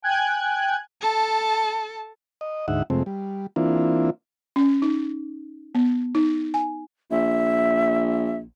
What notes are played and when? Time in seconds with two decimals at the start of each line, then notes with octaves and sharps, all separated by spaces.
0.02 G5 G#5 F#6 G#6
1.01 A4 A5
2.41 D#5
2.68 D2 G#2 D#4 E5 F#5
2.90 F2 C3 G#3 A3 C4
3.06 G3
3.56 E3 A#3 C4 D4 E4 F4
4.56 C#4
4.82 D#4
5.75 B3
6.15 D#4
6.54 G#5
7.11 A#1 E5